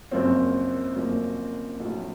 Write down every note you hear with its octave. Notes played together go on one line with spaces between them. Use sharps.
F#1 F#2 F3 A#3 C4
F#1 F#2 F3 A#3
A#1 A2 F#3